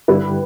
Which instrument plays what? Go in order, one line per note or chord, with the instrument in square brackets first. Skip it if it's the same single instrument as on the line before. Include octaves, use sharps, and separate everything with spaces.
[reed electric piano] G2 D3 G3 E4 [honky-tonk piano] G4 B4